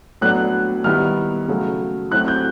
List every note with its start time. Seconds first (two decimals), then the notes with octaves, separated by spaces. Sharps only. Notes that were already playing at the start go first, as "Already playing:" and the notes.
0.21 A2 F#3 B3 D4 F#6
0.84 D#3 G3 B3 E4 F6
1.48 C#3 F#3 A3
2.11 F#3 A3 C4 E4 F#6
2.28 G6